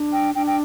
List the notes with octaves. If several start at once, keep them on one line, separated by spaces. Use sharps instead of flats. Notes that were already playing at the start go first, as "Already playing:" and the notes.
Already playing: D4
G5
D4 G5
G5